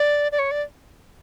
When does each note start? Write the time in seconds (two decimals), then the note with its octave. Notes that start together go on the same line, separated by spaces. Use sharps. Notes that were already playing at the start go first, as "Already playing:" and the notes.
Already playing: D5
0.32 D5
0.39 C#5
0.51 D5